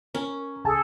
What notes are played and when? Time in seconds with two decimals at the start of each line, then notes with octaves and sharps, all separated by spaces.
0.15 C#4 A#4
0.65 C#2 G#4 A4 G#5 A5